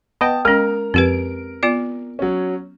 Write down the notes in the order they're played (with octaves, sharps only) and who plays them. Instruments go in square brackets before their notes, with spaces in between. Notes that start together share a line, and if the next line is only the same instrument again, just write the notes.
[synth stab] B3 D#5 G5 [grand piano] A5
[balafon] G#3 C#4 [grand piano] A#4 F6
[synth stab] F2 D7 [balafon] C4 G4 B4
[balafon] B3 F4 D5
[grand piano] F#3 C#4